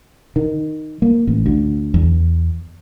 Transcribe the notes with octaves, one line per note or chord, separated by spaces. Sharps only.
D#3
A#3
A1
D2
E2